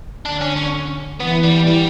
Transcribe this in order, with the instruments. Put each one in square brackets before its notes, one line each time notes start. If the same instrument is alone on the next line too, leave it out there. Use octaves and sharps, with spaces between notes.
[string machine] D3 [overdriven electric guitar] D4
[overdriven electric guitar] C#4
C#4
[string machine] E3 [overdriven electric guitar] B3
[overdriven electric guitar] G3
G3